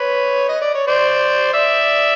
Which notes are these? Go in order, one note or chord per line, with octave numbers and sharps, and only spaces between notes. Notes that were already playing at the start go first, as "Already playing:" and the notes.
Already playing: B4 C#5
D#5
D5
C#5
C5 D5
D5 E5